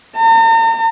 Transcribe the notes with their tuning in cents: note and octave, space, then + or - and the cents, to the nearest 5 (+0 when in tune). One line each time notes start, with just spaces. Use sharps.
A#5 -45